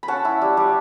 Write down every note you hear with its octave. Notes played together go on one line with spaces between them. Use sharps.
B5
C#4 F#5 A5
E4
G3
G3